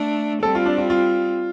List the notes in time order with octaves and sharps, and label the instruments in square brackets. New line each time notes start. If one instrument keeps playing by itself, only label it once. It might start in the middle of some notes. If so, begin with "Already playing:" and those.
Already playing: [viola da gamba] A3 D4
[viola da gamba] G3 C4 [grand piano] A4
[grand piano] F4
D4
F4
F4